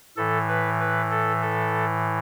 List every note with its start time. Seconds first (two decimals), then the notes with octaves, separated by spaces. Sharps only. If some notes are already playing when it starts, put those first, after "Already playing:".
0.17 A2 E3 A4
0.48 B4
0.80 B4
1.11 A4
1.42 A4